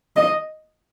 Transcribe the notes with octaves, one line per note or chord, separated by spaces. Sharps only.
D#5